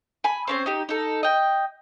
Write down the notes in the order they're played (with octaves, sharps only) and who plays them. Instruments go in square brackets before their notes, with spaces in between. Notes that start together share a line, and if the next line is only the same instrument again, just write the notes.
[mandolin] G#5 B5
C4 C#4 C5
D#4 G4
D#4 A4
D#5 G5